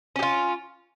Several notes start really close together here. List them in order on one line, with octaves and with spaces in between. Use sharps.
C#4 G4 F4